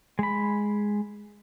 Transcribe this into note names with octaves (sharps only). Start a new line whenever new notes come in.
G#3 B5